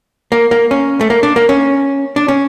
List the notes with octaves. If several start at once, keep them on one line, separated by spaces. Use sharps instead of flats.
A#3
A#3
C#4
A3
A#3
D4
A#3
C#4
D4
C#4